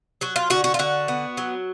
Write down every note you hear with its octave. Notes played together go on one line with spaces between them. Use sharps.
F#3 F#4
F4
D3 F#4
F#4
F4
D3 F#4
B3
F#3